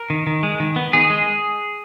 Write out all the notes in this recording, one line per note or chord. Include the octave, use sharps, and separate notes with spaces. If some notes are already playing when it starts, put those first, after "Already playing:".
Already playing: A#4
D#3
D#3
G#3
D#3
B3
D#3 G#4
G#3